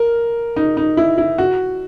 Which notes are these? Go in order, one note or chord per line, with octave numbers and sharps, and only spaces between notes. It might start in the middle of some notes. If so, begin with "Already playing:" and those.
Already playing: A#4
D#4
D#4
E4
E4
F#4